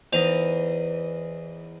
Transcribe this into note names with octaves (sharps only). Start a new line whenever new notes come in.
E2 E3 D#4 C5 F7